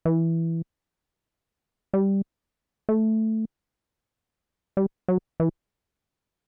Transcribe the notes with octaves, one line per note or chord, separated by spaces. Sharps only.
E3
G3
A3
G3
F#3
E3